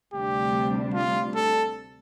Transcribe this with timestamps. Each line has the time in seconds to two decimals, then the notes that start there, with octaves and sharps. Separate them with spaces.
0.13 D2 C3 G3 D4 G4
0.94 F4
1.36 A4